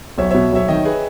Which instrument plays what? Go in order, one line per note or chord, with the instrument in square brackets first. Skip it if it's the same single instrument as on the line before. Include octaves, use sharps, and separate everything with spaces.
[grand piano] B1 [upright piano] C#5 E5
[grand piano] B2 [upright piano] C#5 E5
[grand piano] B1 [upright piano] C#5 E5
[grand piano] D#3 [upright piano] D#5 G5
[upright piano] G#4 B4